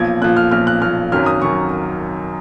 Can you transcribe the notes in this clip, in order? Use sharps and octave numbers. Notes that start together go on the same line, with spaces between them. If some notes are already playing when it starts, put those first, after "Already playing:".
Already playing: B1 A#2 F3 G#6
B1 A#2 F3 F#6
F6
B1 A#2 F3 F6
F#6
B1 A#2 F3 F6
G#1 F#2 D#3 F#3 F6
D#6
G#1 F#2 D#3 F#3 C#6